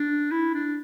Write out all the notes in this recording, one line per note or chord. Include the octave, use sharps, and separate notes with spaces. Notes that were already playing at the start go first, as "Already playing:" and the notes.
Already playing: D4
E4
D4